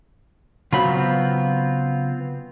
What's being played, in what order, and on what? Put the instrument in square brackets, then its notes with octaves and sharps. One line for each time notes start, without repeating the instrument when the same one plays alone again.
[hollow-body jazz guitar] C#3 F#3 B5 [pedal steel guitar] B3 C4 F4